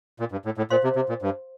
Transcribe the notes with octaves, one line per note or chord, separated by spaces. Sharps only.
A#2
G2
A2
A2
A#2 C5 F5 C6
C3
C3
A#2
G2